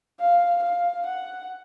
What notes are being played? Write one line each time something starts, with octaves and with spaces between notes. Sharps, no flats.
F5
F5
F#5